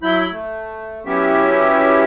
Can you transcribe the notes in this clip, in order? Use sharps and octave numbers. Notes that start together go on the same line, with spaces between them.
F#3 E4 B5 G6
A3
F#3 B3 C#4 E4 G4 E5